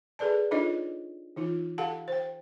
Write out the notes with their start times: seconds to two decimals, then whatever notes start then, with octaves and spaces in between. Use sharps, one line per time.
0.19 G#4 A4 B4 D5 A5
0.51 D4 D#4 F4 A4 C#5 D#5
1.36 E3 D#4 F4
1.78 G4 A4 F5 F#5 A5
2.08 C5 G5